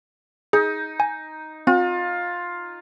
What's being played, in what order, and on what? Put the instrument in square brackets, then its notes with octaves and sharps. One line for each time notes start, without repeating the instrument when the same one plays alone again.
[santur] D#4 [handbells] G#4
[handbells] G#5
[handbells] C4 [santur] F4